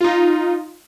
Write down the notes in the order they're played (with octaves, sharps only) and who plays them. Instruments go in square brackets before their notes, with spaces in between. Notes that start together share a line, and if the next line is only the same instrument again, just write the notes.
[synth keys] D#4 F4